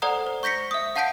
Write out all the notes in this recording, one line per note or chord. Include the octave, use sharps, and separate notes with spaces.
A4 C5 D5 F#5 A#5 D#6
C5
C#6 G6 A#6 B6 C#7
E5 D#6
F5 F#5 A5 G6 B6 D7